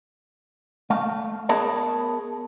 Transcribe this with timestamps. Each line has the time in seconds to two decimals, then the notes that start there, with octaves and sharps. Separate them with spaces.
0.90 A3 F5
1.49 B3 G#4 A#4 C#5 A5